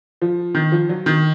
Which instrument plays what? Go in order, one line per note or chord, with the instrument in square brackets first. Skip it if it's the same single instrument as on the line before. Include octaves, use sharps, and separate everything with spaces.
[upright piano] F3
D#3
F3
F#3
D#3